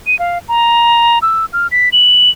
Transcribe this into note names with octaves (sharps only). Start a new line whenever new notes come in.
D#7
F5
A#5
E6
F6
B6
F#7